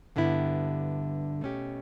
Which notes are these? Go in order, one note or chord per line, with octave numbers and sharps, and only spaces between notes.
G2 D3 G3 B3 E4
B2 A3 C#4 G4